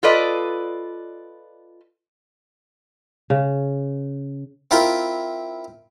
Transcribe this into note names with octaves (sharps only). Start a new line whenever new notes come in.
F4 A4 B4 D5 D#5
C#3
C4 E4 F4 A#4 G5